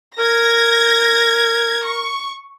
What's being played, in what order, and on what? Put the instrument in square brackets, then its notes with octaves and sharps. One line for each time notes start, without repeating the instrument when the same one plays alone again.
[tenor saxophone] A#4 [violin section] G#6 A#6
[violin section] C#6